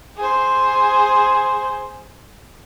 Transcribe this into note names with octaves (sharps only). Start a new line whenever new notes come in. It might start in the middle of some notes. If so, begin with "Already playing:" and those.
G#4 C5